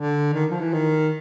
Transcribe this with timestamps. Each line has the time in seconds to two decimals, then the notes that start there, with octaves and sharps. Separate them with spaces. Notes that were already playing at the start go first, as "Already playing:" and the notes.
Already playing: D3
0.33 D#3
0.50 F3
0.60 E3
0.73 D#3